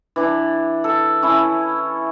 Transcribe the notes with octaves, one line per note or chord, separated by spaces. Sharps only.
E3 D4
A4
C#4 E4